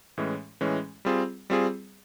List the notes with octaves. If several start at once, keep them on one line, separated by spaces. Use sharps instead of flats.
A2 E3 G#3 C#4
A2 E3 G#3 C#4
G3 C4 F4 G#4
G3 C4 F4 G#4